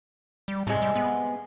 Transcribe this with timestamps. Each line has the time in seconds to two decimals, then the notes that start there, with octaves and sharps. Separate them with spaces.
0.48 G3
0.67 A2 C3 G#3
0.82 G3
0.95 B3